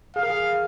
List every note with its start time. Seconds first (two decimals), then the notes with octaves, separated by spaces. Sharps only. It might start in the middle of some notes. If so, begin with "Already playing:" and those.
0.16 G#4 F5
0.23 A#4
0.30 G#4